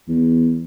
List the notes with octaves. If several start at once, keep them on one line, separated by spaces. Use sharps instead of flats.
E2